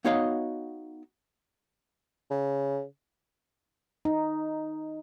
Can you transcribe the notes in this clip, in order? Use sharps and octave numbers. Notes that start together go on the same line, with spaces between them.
B3 D#4 F#4 C#5 D#5 F5
C#3
D#4